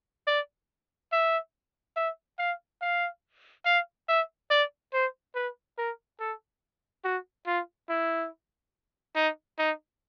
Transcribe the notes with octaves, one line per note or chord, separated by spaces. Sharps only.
D5
E5
E5
F5
F5
F5
E5
D5
C5
B4
A#4
A4
F#4
F4
E4
D#4
D#4